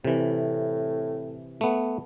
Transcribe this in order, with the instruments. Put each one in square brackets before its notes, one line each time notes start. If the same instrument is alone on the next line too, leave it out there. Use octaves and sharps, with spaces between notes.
[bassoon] A2 [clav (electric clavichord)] C3 E3
[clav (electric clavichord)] A3 B3